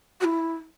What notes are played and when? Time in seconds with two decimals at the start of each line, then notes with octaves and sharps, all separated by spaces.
0.21 F#4
0.24 E4